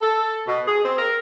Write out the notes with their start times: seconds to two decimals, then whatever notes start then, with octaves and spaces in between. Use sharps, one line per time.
0.02 A4
0.47 B2
0.68 G#4
0.85 C4
0.99 A#4